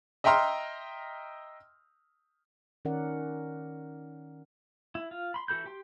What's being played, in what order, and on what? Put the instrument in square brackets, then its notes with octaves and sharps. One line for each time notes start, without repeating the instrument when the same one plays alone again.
[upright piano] D#5 E5 G5 A#5 C6 F6
[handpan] D#3 C#4 A#4 D5 F#5
[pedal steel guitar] E4
F4
B5 C6
E3 F#4 A4 B5 G6
G4 G5 C6